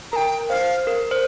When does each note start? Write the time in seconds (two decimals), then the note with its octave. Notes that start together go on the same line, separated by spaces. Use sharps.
0.12 A#4 G5 A#5
0.49 C5 F5
0.87 A#4
1.11 C5